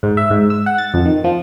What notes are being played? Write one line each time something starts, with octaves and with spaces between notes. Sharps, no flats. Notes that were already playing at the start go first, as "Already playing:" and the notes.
G#2
E5
G#2
E6
F#5
A6
F2
D#3
F3